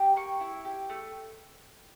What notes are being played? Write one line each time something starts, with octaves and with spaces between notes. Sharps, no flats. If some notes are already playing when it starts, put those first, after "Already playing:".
Already playing: G4
A#3 C#6
E4
G4
A3